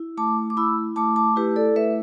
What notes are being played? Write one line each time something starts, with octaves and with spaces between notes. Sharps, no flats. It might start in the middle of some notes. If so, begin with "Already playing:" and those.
Already playing: E4
A3 A5 D6
D6
E4 B5 E6
A3 A5 D6
A5 D6
E4 G4 B4
A4 D5
A3 B4 E5